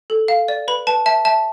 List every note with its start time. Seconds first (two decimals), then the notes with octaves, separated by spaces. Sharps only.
0.10 A4
0.28 F5
0.48 D5
0.68 B4 B5
0.87 B4 A5
1.06 E5 A5
1.25 E5 A5